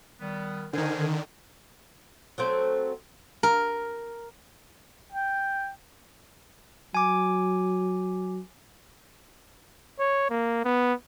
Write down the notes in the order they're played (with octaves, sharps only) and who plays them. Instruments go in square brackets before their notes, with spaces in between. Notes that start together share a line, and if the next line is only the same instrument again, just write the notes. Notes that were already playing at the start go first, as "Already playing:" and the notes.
[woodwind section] D#3 G3 B3
[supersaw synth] D3 D#3 [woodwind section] A#4 C5 G#5
[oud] F#3 A3 C4
[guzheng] A#4
[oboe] G5
[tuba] F#3 [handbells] G#5 D6
[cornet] C#5
A#3
B3